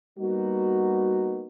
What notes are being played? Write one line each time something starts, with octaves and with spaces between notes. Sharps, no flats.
G3 A#3 B3 D#4 F#4